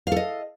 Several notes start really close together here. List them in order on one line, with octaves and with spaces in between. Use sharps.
F5 A4 D#5